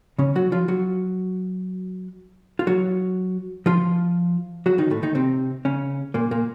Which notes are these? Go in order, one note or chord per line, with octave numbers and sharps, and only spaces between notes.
C#3 C#4
F#3 F#4
F3 F4
F#3 F#4
F4
F#3 F#4
F3 F4
F#3 F#4
D#3 D#4
A2 A3
D#3 D#4
C3 C4
C#3 C#4
A#2 A#3
A#2 A#3